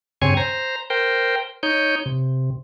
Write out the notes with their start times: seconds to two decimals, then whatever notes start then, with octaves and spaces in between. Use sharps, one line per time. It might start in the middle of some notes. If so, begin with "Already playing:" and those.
0.22 G2 C#3 C4 C#5 G#5
0.37 C5 A#5
0.90 A#4 C5 G5
1.63 D#4 C#5 G6
2.06 C3